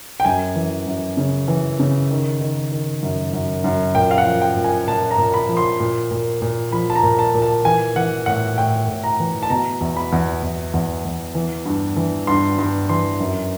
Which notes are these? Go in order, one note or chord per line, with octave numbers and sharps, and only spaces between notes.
G5
F#2 G#5
E3
F#2
C#3
E3
C#3
D#3
D#3
D#3
F#2
F#2
F#2
A#2 G5
F5
F#5
F3
G5
A#2
G#5
A#2 A5
A#5
A#2
B5
F3
C6
A#2
A#2
A#2
F3 B5
A5
A#5
A#2
A5
A#2
A5
E3 G#5
E3 F#5
A2 F#5
A2 G5
A2
A#5
E3
A5
B2 A#5
E2
B5
E2
E2
E2
E2
E3
G2
E3
G2 C6
G2
E3 C6
F#2